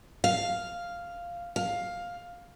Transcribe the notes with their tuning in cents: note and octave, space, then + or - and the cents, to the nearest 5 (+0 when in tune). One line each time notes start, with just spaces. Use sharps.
F5 -5
F5 +10